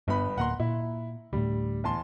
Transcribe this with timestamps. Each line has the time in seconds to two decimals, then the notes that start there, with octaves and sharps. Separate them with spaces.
0.08 G1 G2 B3 B5
0.38 D1 A#3 F#5 A#5 C6
0.60 A#2 E4
1.33 D2 A2 G3
1.84 E2 A5 C6